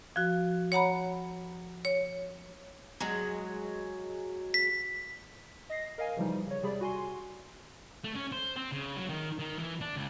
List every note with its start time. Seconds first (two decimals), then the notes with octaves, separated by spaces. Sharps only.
0.16 F3 F#4
0.72 C#5 F#5 A#5 B5
1.85 C#5
3.00 F#3 G#3
4.54 B6
5.70 D#5 A#6 C7
5.98 A#4 D#5 F5 G#5
6.17 C#3 E3 F3 G3 D#4
6.46 C#3 C#5
6.63 C3 G3 G#4 D5 B5
6.81 F#4 G#5 C6
8.04 A3
8.15 C#4
8.32 C5
8.56 C4
8.72 C#3
8.96 F#3
9.09 D#3
9.39 D#3
9.59 E3
9.81 D4
9.96 C#2